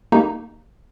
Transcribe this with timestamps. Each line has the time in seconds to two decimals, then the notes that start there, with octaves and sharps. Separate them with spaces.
0.12 A#3 D#4 G4 A#5